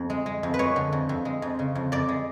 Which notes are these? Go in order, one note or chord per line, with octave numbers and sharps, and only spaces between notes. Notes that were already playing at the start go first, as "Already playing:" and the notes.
Already playing: F2
G#3
G#3
F2
B4
G#3 C#5
D3
F2
F2
G#3
F2
C#3
F2
F2 D5
G#3